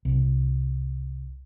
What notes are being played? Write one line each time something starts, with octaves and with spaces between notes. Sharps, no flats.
C2